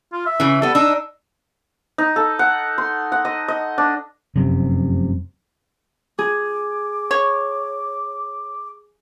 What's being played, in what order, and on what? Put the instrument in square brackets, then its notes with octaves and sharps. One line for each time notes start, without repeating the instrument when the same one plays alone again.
[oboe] F4
E5
[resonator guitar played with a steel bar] C#3 E3
[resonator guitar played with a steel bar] G3 B3 [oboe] A4
[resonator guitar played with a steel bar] D4 D#4 [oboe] E6
[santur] D#4
A4
F#5
C6
F#5
D#5
D#5
D4
[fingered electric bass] F1 F#2 C3
[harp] G#4 [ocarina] D6
[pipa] C#5